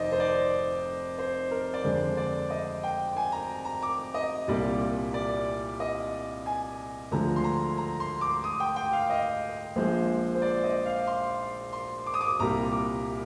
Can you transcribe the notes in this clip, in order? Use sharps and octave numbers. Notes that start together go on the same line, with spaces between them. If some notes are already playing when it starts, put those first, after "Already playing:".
Already playing: F1 F2 D#3 C5 D5 D#5
C5
D5
C5
A#4
D5
F2 D3 G#3 C5
D5
D#5
G5
G#5
A#5
A#5
D6
D#5
C2 A#2 G3 A#3 D5
D5
D#5
G#5
D2 D3 F3 G#3 A#5
C6
A#5
A#5
C6
D6
D#6
G5
G5
F5
D#5
A#1 A#2 F3 G#3 C5
C5
D5
D#5
F5
C6
C6
D6
D#6
D6
C2 A#2 G3 A#5
D6